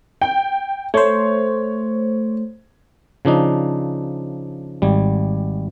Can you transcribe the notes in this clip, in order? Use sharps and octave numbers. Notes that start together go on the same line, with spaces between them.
G5
A3 C5 C#5
C#3 F3 D4 D#4
G#1 G3